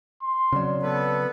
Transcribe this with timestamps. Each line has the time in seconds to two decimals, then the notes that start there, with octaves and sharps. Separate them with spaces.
0.22 C6
0.53 C#3 F#3 C4 D5
0.83 B3 A4 B4